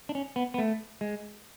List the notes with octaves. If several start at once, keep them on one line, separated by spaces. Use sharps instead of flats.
D4
C#4
B3
B3
A3
G#3